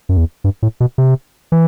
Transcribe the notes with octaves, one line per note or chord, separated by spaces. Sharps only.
F#2
E2
G2
A2
B2
C3
E3